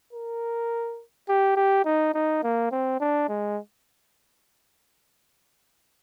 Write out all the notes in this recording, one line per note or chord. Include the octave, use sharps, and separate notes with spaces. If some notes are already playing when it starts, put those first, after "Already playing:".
A#4
G4
G4
D#4
D#4
A#3
C4
D4
G#3